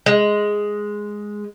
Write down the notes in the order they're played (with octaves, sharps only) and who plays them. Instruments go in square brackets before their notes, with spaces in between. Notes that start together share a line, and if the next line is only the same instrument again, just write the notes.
[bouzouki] G#3